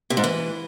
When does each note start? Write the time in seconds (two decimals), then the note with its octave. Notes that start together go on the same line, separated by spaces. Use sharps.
0.10 C3
0.17 G#2
0.24 E3